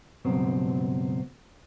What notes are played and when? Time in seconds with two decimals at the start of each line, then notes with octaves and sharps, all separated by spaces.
0.25 C#2 G2 B2 F#3 C4